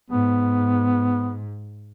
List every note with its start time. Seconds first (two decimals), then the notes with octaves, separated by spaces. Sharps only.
0.11 G#2 B3